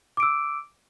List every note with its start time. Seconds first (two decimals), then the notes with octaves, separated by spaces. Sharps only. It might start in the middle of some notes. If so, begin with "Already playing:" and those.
0.17 D6
0.20 D7
0.23 E6